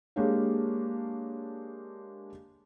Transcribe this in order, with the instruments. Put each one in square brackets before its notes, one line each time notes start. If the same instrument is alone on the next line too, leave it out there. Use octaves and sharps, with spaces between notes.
[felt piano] G#3 A#3 D4 G4 C#5 F5